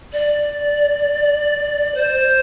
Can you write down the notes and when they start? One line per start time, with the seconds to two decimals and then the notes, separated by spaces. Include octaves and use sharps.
0.12 D5
1.94 C5